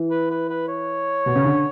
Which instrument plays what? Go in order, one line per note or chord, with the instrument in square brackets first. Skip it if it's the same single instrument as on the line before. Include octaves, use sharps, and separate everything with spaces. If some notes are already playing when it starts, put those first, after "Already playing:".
Already playing: [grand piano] E3
[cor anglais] B4
B4
B4
C#5
[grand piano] B2
C#3
D3